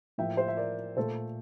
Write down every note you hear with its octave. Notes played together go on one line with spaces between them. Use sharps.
A2 F3 A#3 E5 G5
C5 E5
E5
A#4 D5
A#2 A3 A4 C5